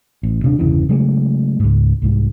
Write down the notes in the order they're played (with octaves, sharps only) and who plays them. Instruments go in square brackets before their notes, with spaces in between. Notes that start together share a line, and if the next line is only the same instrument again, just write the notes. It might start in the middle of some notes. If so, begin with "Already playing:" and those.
[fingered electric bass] A1
D#1 C3 D4
G1 E2 C#3 E3
C#3 F#3 G#3 A3
C#2 G#2
C2 G#2